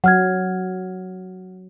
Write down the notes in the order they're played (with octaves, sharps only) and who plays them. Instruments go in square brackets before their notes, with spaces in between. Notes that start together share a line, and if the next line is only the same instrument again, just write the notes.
[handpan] F#3 [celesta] F#5 F6 G#6